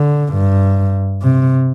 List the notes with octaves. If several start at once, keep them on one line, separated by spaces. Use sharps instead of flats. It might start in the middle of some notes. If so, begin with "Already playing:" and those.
Already playing: D3
G2
C3